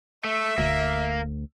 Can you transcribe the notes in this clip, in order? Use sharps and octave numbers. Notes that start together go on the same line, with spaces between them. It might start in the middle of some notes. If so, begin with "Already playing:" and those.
A3 E5
E1 D2 A#3